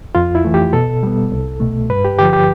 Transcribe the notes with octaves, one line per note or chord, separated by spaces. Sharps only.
F2 F4
E4
E3 A3
G4
B2 A4
G3 B3
C2
B2 A3
G2 B4
G4
D3 F3 G4
G4